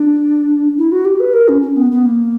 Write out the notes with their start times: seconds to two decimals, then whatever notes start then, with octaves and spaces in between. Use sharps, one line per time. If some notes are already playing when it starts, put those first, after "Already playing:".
Already playing: D4
0.78 E4
0.92 F#4
1.05 G4
1.20 B4
1.33 A#4
1.48 C#4
1.62 C#4
1.76 B3
1.91 B3
2.05 A#3